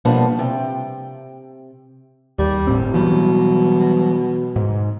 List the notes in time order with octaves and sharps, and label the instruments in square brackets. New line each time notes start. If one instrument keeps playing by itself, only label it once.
[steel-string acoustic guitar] B2 F3 G3 A#3 B3 D4
C3 G5
[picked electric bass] D#2 [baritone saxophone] G3
[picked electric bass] G1 A2 C4
[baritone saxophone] B2 [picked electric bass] E3 F#3 G3
[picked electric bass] G#2